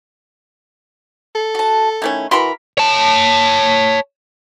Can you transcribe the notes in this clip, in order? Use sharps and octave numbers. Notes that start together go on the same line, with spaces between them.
A4
F#4 A5
D#3 A3 C#4 E4
E3 F#4 A#4 B5 C6
C#5 A5